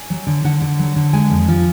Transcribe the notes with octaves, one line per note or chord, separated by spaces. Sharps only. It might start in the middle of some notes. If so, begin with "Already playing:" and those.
Already playing: G#5
F#3
D3
D3 F#5
D3
F#3
D3
G#3 G#5
F2
F3